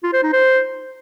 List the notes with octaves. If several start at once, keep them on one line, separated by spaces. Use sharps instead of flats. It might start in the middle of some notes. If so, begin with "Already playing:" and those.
F4
C5
D#4
C5